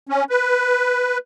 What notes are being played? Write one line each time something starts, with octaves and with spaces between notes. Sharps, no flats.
C#4
B4